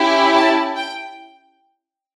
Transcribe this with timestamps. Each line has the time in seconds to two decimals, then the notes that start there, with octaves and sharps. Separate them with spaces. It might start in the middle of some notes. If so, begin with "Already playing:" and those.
Already playing: C#4 E4 G4
0.34 A5
0.76 G5